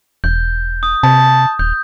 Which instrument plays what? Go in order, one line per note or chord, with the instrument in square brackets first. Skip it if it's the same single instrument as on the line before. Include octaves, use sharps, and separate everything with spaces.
[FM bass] E1 [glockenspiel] G6
[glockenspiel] D#6
[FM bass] C3 [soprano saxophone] A5
[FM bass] D#1 [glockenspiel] G6